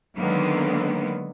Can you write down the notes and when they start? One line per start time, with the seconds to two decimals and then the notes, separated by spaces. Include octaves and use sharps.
0.17 D3 D#3 F#3 G#3 A#3 B3